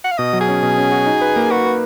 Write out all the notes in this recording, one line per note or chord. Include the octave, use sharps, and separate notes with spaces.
F#5
F5
B2 D#5
F#3
G#4
C#4
B2
C#4
F#4
D#4
B4
A#3
F#4 B4
B4